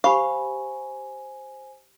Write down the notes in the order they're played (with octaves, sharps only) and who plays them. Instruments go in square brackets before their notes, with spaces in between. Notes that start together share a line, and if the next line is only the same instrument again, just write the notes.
[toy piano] G4 B5 C#6 [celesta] C5 G#5 [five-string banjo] F5